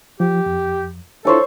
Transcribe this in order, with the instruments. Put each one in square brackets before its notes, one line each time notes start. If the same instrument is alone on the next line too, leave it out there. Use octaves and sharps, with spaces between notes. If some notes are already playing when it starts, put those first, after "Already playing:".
[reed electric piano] F3 [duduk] G4
[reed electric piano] F2
[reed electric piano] D4 E4 F4 [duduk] A4 [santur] C5 C#5 A5